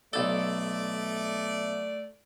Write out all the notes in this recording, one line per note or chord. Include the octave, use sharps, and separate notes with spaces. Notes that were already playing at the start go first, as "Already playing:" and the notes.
B1 A3 A4 D5